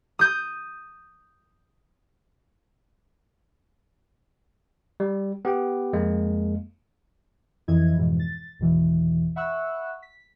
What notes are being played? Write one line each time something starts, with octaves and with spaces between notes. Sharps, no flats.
D#6 G6
G3
B3 G4 G5
F2 G#3 A#3
F2 E3 E4 D#5 G#6
F2 G#2 B2 E3
A6
G#1 E2 B2 E3
E5 F#5 B5 C#6 E6 F#6
B6